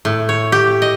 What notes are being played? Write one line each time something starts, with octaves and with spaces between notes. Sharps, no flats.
A2
C#5
G4
D#5